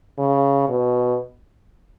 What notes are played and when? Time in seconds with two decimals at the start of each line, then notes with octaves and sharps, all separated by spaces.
0.19 C#3
0.69 B2